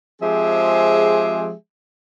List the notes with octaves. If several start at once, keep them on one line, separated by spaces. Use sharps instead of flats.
F3 G#3 C4 G4 G#4 E5